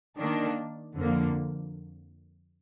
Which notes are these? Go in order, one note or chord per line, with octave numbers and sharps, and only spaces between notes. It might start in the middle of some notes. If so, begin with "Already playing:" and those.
D#3 A#3 D4
F2 D3 F3 A#3